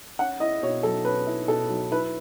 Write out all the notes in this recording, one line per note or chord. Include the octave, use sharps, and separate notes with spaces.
C#4 F#5
E4 D#5
B2 C#5
F#3 A4
C#4 B4
E4
B2 A4
F#3
E4 B4